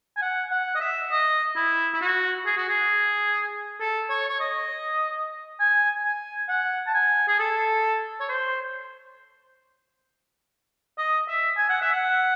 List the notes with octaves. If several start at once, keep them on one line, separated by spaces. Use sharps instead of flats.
G#5
F#5
F#5
D#5
E5
D#5
E4
E4
F#4
G#4
F#4
G#4
A4
C#5
C#5
D#5
G#5
G#5
F#5
A5
G#5
G#4
A4
C#5
C5
D#5
E5
G#5
F#5
E5
F#5